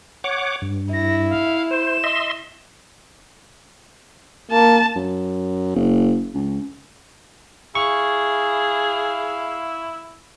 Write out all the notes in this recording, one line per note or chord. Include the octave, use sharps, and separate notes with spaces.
C#5 F#5 D6
G2
E4 A#6
F5
C5 E7
D#5 E5 C6
A#3 A5
F#2
F#1
C#2
E4 G#4 F5 C#6